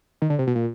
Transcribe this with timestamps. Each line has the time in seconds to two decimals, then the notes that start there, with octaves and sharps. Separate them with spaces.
0.22 D#3
0.30 D3
0.39 C3
0.47 B2
0.55 A#2